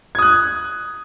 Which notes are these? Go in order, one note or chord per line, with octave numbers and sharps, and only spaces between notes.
D#6 F#6 G#6